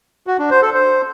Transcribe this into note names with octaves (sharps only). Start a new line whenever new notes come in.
F#4
D4
C5
A4
C5